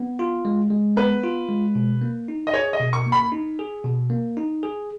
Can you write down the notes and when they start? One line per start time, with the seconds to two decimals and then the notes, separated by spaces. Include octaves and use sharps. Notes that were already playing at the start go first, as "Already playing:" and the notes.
Already playing: B3
0.19 F4
0.45 G#3
0.70 G#3
0.97 B3 B4
1.24 F4
1.49 G#3
1.75 B2
2.01 A#3
2.28 D#4
2.47 D#5
2.53 G#4 C#5
2.73 D#5
2.80 B2
2.93 C#6
3.06 A#3
3.12 B5
3.32 D#4
3.59 G#4
3.85 B2
4.10 A#3
4.37 D#4
4.63 G#4